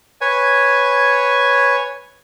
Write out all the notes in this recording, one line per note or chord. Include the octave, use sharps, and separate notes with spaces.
B4 C#5 G#5